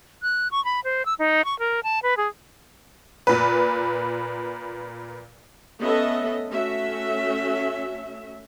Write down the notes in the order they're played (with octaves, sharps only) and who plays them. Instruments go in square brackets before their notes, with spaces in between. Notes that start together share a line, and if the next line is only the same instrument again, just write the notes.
[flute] F#6
C#6
B5
C5
E6
D#4
C#6
A#4
A5
B4
G#4
[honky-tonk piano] A#2 B4
[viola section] A3 B3 C#4 A4 D#5 E5
A3 C#4 F#4 E5